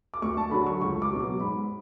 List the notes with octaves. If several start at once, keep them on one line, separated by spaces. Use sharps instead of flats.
D6
D2 C#6
A5
D3 F#3 B5
C#6
C#2 C#6
D6
B2 F#3
D6
G#2 B5